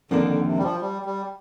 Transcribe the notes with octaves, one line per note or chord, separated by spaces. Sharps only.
F2 D3 D#3 A#3 D4
D3
C3
G3
F3
G3
G3